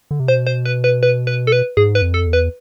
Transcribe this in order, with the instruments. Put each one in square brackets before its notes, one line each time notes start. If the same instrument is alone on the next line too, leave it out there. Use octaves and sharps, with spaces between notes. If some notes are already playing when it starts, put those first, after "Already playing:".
[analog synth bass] D3
C3
[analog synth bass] B2 [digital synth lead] C5
[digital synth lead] C5
B4
B4
B4
B4
A4
B4
[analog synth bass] G#2 [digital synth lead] G#4
[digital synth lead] B4
[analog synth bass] F2
[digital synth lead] A4
[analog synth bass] E2
[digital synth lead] B4